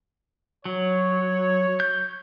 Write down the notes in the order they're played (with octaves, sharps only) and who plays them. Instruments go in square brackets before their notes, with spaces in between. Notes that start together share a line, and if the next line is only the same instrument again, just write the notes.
[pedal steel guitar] F#3 [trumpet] C#5
[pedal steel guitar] G6